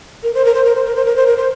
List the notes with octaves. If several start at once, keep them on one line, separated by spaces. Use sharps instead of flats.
A#4
C5
A#4
C5
A#4
C5
A#4
C5
A#4
C5
A#4
C5